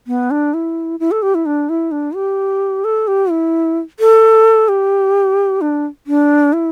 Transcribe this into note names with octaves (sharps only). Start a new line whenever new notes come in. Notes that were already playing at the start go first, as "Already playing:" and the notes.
B3
D4
E4
E4
A4
G4
E4
D4
E4
D4
G4
A4
G4
E4
A4
G4
D4
D4
E4